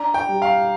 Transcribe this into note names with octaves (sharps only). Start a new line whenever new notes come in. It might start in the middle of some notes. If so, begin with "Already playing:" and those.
Already playing: D4 A#5
G5
G3
F5